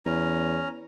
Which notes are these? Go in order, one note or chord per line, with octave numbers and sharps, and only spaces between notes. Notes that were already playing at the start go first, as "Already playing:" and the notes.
E2 C#4 A#5